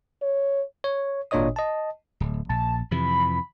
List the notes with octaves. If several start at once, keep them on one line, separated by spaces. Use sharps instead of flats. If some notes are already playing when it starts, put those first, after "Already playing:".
C#5
C#5
G#1 A#2 D4 C#5 D#5 D#6
D#5 A5
D1
A#1 A5
F2 C3 E3 B5